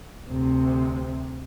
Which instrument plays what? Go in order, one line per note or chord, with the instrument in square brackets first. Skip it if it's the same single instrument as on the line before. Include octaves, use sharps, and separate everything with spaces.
[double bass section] D2 C3